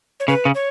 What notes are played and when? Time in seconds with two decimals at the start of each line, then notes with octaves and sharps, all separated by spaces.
0.20 C#5
0.28 C#3 B4
0.45 C#3
0.55 C#5